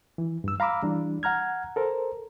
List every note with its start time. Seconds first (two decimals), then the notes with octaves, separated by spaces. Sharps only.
0.18 E3
0.44 G2 E6
0.60 F5 A#5 B5 D6 E6
0.83 E3 G3 D4
1.23 F#5 A#5 F6 G#6
1.76 A4 A#4 C5